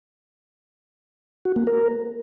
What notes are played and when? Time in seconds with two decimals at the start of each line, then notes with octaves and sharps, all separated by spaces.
1.45 F#4
1.56 A#3
1.67 A#4